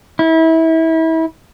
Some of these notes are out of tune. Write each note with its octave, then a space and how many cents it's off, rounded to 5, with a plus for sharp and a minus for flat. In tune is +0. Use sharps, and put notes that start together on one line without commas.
E4 -30